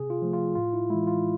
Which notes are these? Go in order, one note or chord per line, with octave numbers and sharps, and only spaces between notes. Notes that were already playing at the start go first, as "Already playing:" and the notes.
Already playing: C3 G#4
F4
F3 A3
F4
A2 F4
E4
E3 G#3 E4
F4